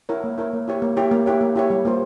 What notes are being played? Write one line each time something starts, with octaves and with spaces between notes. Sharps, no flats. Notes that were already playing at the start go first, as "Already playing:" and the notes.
E4 A#4 C#5
A#3
E4 A#4 C#5
A#3
E4 G4 C#5
A#3
E4 G4 C#5
A#3
E4 G4 C#5
A#3
E4 G4 C#5
G3
A#3 F4 C5